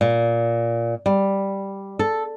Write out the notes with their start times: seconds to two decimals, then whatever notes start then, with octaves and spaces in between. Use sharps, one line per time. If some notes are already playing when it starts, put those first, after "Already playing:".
0.01 A#2
1.06 G3
1.99 A4